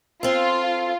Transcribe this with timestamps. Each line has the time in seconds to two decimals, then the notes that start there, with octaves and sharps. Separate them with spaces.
0.23 C4 F4 A4